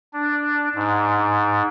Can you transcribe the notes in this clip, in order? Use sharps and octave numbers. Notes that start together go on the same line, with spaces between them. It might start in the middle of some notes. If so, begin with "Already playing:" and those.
D4
G#2